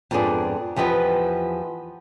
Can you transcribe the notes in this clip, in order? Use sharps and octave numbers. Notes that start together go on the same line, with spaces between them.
F2 G#2 B3 D4 G#4 D5
E2 F3 G4 B4 D#5